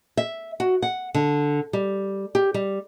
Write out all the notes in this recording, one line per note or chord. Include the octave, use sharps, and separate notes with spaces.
E5
F#4
F#5
D3
G3
G4
G3